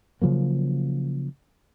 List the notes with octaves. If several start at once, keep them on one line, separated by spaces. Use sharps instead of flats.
C#3 F3 F#3 A#3